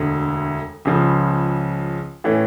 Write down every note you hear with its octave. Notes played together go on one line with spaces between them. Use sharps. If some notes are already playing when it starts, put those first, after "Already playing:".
Already playing: E1 D2 D3
C#2 C#3 F3
A2 E3 A3 C#4